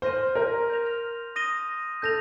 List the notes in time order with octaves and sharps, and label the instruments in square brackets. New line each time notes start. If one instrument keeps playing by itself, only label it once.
[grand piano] C5 [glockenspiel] C6 F6 A#6 D#7
[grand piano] A#4
[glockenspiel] G6 A#6 F7
D#6 A#6 D#7 G7
[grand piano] A4 [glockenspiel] G6 A#6 F7